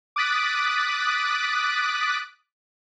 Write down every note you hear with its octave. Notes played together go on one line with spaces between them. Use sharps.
D6 D#6 F#6 A6 B6 D7